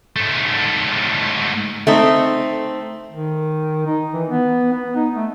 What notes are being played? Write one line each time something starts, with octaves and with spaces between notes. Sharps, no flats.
G#2 A3
A3 C4 D#4
D#3
D#4
E3
B3
B3
D#4
A3